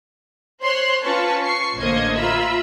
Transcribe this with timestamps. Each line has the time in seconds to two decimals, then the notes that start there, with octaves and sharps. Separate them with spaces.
0.62 C5 C#5 C6 F#6 C7
1.02 C#4 F4 B4 A5 C#6
1.43 C#6 C7
1.78 A1 D3 A#3 C5 D#5 G#6
2.16 F4 E5 A#5 B5 E6